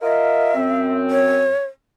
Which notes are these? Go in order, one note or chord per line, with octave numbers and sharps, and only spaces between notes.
F4 A#4 D#5 E5
F#2 C4
C#5